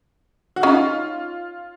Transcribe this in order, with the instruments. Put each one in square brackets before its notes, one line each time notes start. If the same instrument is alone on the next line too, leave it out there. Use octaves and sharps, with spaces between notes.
[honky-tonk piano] F#4
[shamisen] C#4 D#4 [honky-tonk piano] F4